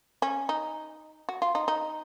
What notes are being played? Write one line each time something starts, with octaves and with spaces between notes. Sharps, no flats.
C#4
D#4
F#4
F4
D#4
D#4